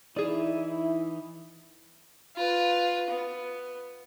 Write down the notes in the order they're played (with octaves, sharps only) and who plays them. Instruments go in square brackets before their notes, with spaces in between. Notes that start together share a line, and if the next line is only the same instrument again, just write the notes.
[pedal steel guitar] E3 D#4 [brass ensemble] E4 [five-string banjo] G#4 D5
[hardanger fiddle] F4 B4
B3